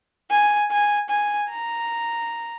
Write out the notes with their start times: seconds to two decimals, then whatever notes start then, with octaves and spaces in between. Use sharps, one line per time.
0.31 G#5
0.71 G#5
1.09 G#5
1.50 A#5